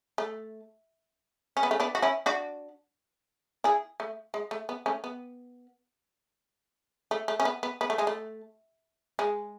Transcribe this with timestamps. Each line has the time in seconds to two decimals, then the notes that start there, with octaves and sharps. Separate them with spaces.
0.18 A3
1.57 C#4
1.63 B3
1.71 A3 C#4
1.80 B3 D4
1.95 F#4
2.02 C#4 E4
2.26 D4 F#4
3.64 E4 G#4
4.00 A3
4.34 G#3
4.51 A3
4.69 B3
4.86 A3 C#4
5.04 B3
7.11 A3
7.28 A3
7.40 C#4
7.45 B3
7.63 B3
7.81 B3
7.90 A3
7.98 G#3
8.07 A3
9.19 G#3